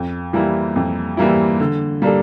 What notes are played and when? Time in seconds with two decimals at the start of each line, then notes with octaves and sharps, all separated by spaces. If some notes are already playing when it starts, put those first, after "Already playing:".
Already playing: F2
0.33 E3 G3 A#3 E4
0.76 F2
1.17 E3 G3 A#3 E4
1.60 D3
2.02 G3 A#3 D4 A4